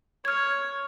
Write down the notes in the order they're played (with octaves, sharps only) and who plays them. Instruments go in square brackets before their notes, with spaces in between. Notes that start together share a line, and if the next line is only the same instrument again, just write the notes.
[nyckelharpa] C#5 [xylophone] F6 G#6